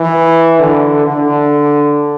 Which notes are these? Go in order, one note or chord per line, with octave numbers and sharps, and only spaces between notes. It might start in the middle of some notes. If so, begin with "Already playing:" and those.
Already playing: E3
D3
D3